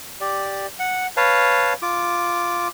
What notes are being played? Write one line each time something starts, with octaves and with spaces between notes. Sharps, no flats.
G4 D5
F#5
B4 C#5 F5 A5
F4 D6